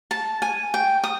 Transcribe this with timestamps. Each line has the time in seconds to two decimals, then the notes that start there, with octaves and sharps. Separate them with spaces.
0.11 A5
0.42 G#5
0.74 G5
1.04 D#6